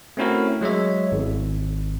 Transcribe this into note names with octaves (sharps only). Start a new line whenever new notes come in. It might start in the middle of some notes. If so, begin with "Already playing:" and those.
A3 C4 C#4 E4 F#4 A#4
F#3 G#3 C#5 E5
G#1